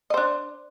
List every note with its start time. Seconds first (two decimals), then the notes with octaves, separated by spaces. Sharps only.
0.10 D#5
0.14 C5
0.17 D4